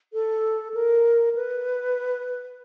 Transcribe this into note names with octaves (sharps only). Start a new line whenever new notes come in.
A4
A#4
B4